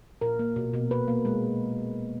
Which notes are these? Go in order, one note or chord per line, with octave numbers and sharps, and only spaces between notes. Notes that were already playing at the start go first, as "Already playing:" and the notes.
A#2 A#4
A#3
B2
B2
B2 B4
A#3
G#3